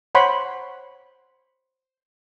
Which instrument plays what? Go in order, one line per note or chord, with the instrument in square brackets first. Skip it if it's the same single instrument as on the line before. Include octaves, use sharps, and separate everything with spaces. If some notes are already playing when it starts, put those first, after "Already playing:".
[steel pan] C5 C#5 F#5 B5 C6